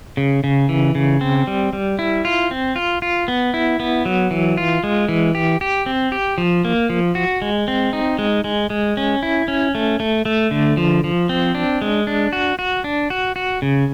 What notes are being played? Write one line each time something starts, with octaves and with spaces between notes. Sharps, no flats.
C#3
C#3
E3
C#3
C4
G3
G3
E4
F4
C4
F4
F4
B3
E4
B3
F#3
E3
F4
G#3
E3
G4
G4
C4
G4
F3
A#3
F3
F#4
G#3
C4
D#4
G#3
G#3
G#3
C#4
E4
C#4
A3
A3
A3
D3
F3
F3
C4
D4
G#3
D4
F#4
F#4
D4
F#4
F#4
C#3